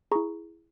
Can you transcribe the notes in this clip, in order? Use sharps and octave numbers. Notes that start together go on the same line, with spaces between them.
E4 G#4 A#5 C#6